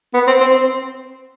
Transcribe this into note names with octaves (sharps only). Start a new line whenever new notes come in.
B3
C4
C4
C4